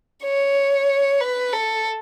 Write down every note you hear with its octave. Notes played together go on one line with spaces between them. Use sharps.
C#5
B4
A4